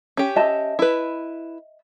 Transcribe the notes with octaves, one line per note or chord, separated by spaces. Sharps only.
C#4 G4
D#5 E5 A5
E4 B4